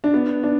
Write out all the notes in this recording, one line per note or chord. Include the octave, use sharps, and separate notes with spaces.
D4
B3
D4